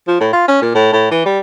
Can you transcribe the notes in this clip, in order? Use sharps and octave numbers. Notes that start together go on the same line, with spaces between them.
F3
A2
F4
C#4
A#2
A2
A2
E3
G3